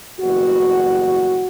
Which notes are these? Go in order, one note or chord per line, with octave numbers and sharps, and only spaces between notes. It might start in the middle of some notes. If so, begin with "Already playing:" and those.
F#1 E2 B2 G3 F#4